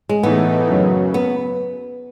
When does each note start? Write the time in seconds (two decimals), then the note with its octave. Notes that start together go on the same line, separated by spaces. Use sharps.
0.09 G#3
0.23 A2 E3 A3 B3 D#4
0.69 F#2 C#3 F#3
1.14 B3